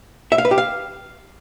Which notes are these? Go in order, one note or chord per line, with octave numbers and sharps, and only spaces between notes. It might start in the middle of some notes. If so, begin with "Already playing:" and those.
E5
F5
B4
G4
F5